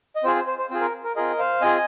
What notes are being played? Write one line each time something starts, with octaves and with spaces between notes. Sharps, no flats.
D#5
C4 F4 G#4 C5
C5
C5
C5
C4 F4 G#4 C5
A#4
A#4
C4 F4 G#4 A#4 D#5
C5 F5
C4 F4 G#4 D#5 G#5